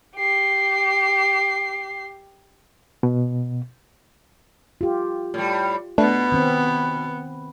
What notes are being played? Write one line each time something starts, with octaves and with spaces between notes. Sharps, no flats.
G4 C7
B2
F4 G4
A2 G3
B2 A3 B3 D4
D#3 C4